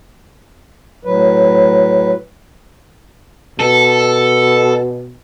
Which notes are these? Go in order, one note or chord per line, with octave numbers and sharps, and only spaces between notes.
A2 F#3 B4
B2 A4